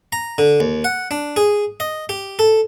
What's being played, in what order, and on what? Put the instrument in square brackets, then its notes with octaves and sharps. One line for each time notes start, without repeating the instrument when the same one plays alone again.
[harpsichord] A#5
D3
D#2
F#5
D4
G#4
D#5
G4
A4